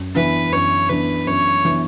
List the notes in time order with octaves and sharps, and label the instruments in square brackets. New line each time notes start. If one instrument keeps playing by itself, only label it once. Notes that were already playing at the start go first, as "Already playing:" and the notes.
Already playing: [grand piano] F#2
[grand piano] E3 B3 D4 [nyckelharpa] B4
[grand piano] F#2 [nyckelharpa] C#5
[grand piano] E3 B3 D4 [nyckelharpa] B4
[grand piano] F#2 [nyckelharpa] C#5
[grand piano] E3 B3 D4